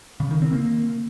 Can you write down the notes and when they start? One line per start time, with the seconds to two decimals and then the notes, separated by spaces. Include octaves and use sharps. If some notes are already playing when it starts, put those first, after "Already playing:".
0.20 C#3
0.31 D#3
0.42 C4
0.53 A#3